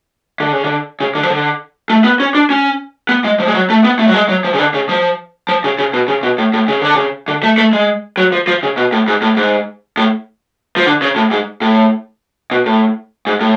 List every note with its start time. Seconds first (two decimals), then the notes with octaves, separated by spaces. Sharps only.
0.40 D3
0.52 C#3
0.64 D3
1.00 C#3
1.15 D3
1.23 F3
1.30 D3
1.90 A3
2.04 B3
2.20 C#4
2.35 D4
2.50 C#4
3.09 B3
3.24 G#3
3.40 F3
3.48 G#3
3.54 F#3
3.70 A3
3.84 B3
3.99 A3
4.08 F#3
4.14 G#3
4.29 F#3
4.44 F3
4.54 C#3
4.59 D3
4.74 C#3
4.89 F3
5.49 F3
5.64 C#3
5.79 C#3
5.93 B2
6.08 C#3
6.23 B2
6.38 A2
6.54 A2
6.68 C#3
6.82 D3
6.96 C#3
7.28 D3
7.43 A3
7.58 A3
7.73 G#3
8.17 F#3
8.32 F3
8.47 F3
8.63 C#3
8.77 B2
8.92 A2
9.08 G#2
9.22 A2
9.37 G#2
9.97 A2
10.76 F3
10.86 D3
11.02 C#3
11.16 A2
11.31 G#2
11.62 A2
12.51 B2
12.66 A2
13.27 G#2
13.41 A2